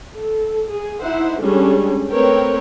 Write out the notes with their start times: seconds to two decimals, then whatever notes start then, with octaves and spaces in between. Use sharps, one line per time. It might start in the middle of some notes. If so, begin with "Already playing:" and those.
0.15 A4
0.71 G#4
1.01 D#4 E4 C5 E5 F#5
1.40 G3 G#3 C#4 D4 G#4 A4
2.10 A3 C4 A#4 B4 C#5 G5